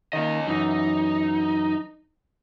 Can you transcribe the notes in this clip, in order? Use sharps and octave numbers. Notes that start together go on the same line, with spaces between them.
D#3 A#3 C#4 D#5
F#2 E3 D#4